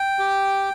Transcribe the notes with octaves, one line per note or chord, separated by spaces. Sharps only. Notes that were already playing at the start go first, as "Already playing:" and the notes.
Already playing: G5
G4